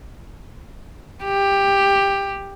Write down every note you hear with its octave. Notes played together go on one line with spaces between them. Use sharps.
G4